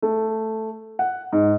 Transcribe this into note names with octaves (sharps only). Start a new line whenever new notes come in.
A3
F#5
G#2